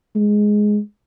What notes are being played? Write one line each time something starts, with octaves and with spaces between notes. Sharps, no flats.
G#3